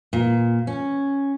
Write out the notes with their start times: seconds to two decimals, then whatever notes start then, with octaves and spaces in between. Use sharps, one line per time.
0.13 A#2
0.67 C#4